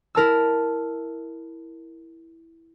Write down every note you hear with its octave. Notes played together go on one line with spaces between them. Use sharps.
E4 A#4 A5 E6